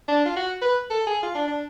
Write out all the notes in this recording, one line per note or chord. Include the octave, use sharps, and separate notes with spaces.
D4
F4
F#4
B4
A4
G#4
F4
D4
D4